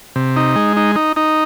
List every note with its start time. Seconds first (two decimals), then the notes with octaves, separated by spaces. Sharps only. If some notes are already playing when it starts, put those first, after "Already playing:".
0.16 C3
0.36 D#4
0.56 G#3
0.77 D#4
0.95 D#4
1.16 D#4